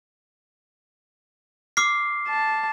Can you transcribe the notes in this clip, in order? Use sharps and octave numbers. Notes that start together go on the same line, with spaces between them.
D6 F6 C7
A5